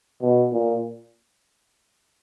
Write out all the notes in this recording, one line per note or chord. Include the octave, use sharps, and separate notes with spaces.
B2
A#2